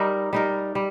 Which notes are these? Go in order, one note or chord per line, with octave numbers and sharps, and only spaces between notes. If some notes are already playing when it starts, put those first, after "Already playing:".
Already playing: G3 D#4 A#4
G3 D#4 A#4
G3